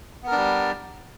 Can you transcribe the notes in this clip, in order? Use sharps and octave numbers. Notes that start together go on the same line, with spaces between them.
G3 B3 D4 A#4